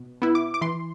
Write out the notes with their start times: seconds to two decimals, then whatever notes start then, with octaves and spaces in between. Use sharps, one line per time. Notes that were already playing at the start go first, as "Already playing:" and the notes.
Already playing: B2
0.22 B3 E4
0.35 D6
0.54 D6
0.61 E3 C6